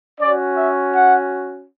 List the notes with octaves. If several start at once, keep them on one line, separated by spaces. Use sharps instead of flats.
C#4 F#4 D5
E5
F#5